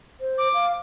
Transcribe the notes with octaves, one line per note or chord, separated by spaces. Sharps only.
C5
D6
F5